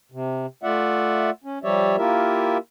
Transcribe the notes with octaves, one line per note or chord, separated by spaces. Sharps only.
C3
A3 F4 D5 E5 F#5
C#4
F3 G3 G4 C#5 D5 E5
A#3 E4 F4 G4 A#4 E5